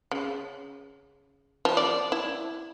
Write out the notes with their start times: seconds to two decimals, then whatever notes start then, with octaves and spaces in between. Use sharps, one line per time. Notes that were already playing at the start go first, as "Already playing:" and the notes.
0.11 C#3
1.65 F3
1.77 D5
2.12 E4